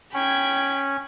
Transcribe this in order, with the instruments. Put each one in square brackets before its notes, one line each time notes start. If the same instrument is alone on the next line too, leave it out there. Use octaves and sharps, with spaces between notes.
[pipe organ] C#4 [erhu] G5 [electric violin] B5 G#6